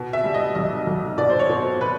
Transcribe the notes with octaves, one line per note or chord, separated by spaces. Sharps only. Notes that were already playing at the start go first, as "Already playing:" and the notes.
Already playing: B2
E5
G3
D#5
B1 D#5
B1
B2 D5
C5
C#5
B2
C5
B2 B4